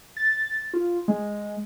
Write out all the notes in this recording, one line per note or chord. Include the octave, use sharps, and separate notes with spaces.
A6
F4
G#3